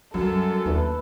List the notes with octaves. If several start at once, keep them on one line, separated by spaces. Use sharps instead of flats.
F#2 F#3 G3 A4
D#2 D4 E4 B4